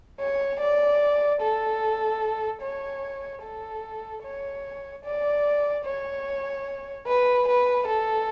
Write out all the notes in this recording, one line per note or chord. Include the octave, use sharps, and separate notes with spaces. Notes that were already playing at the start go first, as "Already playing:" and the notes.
C#5
D5
A4
C#5
A4
C#5
D5
C#5
B4
B4
A4